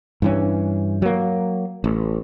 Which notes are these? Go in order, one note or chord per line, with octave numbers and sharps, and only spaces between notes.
G2 E3 C#4
F#3 A#3
A1